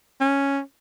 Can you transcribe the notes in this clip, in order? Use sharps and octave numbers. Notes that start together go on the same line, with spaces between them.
C#4